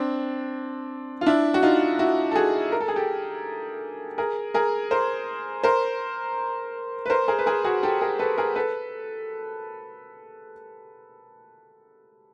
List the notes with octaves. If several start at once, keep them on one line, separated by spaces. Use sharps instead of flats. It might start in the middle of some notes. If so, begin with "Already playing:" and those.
Already playing: C4 D4
F4
D4 E4
F#4
D#4 F4
E4 F#4
A4
F#4 G#4
A#4
A4
G#4
G4 A4
G#4 A#4
G#4 A#4
A#4 C5
A#4 C5
B4
A#4 C5
G#4 A#4
B4
G#4 A#4
F#4 G#4
G4 A4
G#4 A#4
A4 B4
G#4 A#4
A4 B4